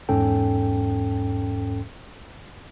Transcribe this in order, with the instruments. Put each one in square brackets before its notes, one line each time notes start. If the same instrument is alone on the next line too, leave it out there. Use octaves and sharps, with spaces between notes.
[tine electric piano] E2 G#2 C#4 A4 G5